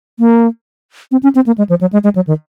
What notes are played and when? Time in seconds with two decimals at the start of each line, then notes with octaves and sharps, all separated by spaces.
0.19 A#3
1.12 C4
1.23 C#4
1.35 C4
1.46 A#3
1.58 G#3
1.69 F3
1.81 F#3
1.93 G#3
2.04 G#3
2.15 F#3
2.27 D#3